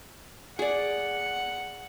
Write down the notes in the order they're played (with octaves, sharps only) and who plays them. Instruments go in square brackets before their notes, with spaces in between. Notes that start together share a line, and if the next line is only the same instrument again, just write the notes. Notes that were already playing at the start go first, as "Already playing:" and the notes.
[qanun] G#4 D5 [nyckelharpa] F#5